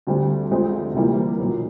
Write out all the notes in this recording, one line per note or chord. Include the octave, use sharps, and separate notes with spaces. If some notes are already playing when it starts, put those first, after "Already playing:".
D2 D3 G3 C4
D2 D3 F3 G#3 C4
C3 E3 G3 A#3
B1 A#2 F#3